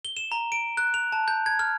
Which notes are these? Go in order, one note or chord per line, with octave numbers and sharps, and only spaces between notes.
G7
E7
A#5
D7
F#6
F7
A5
G6
G#6
F6